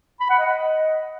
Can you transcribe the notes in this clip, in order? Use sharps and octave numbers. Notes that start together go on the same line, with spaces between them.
B5
F#5
D#5